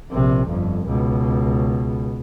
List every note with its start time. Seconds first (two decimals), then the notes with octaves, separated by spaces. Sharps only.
0.12 A#1 C3
0.47 G1 F2
0.86 C#2 B2